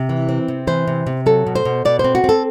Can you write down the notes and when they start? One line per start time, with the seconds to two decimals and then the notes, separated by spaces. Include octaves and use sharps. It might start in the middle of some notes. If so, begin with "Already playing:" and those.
Already playing: C3
0.09 E3
0.29 C4
0.48 C3
0.67 E3 C5
0.87 C3
1.07 C3
1.26 F#3 A4
1.47 B2
1.55 C5
1.65 B2
1.85 B2 D5
1.99 C4 C5
2.15 F#4
2.24 C4 A4